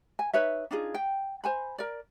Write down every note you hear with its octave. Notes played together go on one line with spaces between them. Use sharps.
G#5
D#4 B4 C#5 E5
D4 D#4 F4 G#4
G5
C5 G#5 B5
A#4 D5